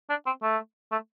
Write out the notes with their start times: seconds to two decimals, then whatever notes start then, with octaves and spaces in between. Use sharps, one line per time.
0.09 D4
0.26 C4
0.42 A3
0.92 A3